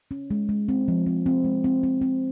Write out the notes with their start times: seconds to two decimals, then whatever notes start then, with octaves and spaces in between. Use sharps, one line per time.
0.11 C#4
0.31 G#3
0.49 G#3
0.68 C4
0.88 F3
1.06 C4
1.26 C4
1.45 G#3
1.64 C4
1.83 C4
2.01 C4